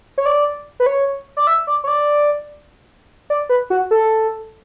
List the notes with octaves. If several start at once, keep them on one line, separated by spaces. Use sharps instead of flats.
C#5
D5
B4
C#5
D5
E5
D5
C#5
D5
D5
B4
F#4
A4